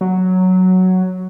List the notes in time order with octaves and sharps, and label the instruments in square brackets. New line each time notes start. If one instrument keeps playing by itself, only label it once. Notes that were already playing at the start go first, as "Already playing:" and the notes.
[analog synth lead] F#3